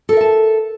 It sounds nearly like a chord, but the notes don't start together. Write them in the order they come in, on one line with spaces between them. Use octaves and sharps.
A4 A#4 E5 A5